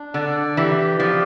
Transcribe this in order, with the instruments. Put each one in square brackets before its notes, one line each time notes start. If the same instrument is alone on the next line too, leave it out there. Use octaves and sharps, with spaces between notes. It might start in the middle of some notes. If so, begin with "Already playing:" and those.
Already playing: [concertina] D4
[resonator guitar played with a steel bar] D3 [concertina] D5
[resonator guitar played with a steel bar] E3 [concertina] G4
[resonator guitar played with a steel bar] F3 [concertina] D5